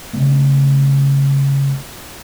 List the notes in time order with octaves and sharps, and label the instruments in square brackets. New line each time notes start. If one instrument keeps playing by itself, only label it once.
[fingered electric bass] C#3 A3 A#3